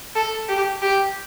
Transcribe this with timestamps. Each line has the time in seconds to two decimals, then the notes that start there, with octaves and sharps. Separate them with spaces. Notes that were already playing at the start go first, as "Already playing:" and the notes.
0.16 A4
0.49 G4
0.82 G4